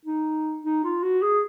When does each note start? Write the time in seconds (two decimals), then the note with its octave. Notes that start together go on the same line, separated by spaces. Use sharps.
0.06 D#4
0.64 D#4
0.84 F4
1.03 F#4
1.23 G#4